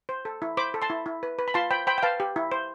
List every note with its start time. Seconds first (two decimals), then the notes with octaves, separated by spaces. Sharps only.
0.09 C5
0.25 A4
0.42 E4
0.57 C5 B5 D6
0.74 A4
0.82 A5 C6
0.90 E4
1.06 E4
1.23 B4
1.39 B4
1.48 B5
1.54 F4 A5 C6
1.71 C5 G5 B5
1.87 C5 G5 B5
1.98 G5
2.03 B4 F5 A5
2.20 G4
2.36 E4
2.52 C5